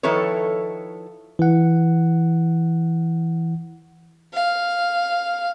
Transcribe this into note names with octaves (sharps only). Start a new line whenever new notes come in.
D#3 F3 E4 A4 B4 C#5
E3 F#5
F5